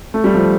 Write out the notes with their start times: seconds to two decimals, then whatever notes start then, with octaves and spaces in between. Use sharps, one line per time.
0.14 A3
0.24 G3
0.34 F3 A3